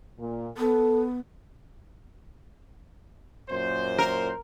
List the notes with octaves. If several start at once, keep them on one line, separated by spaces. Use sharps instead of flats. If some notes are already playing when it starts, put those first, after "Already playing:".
A#2
B3 A4
F#2 A#2 C5
A#4